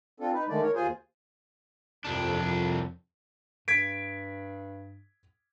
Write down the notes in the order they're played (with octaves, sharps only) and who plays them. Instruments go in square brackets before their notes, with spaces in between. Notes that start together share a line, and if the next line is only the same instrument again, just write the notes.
[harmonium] C4 D4 F4 A4
D#4 B4
D3 D#3 G#3 A3 D5
A#4 C#5
D#2 F4 G#4 C5 G#5
[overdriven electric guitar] C2 D4 [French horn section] F2
[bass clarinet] G2 [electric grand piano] G#6 B6 D7